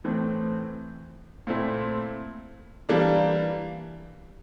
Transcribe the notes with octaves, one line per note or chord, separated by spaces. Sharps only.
A2 E3 A3 C4
A#2 A3 C4 E4
E3 G3 A#3 D4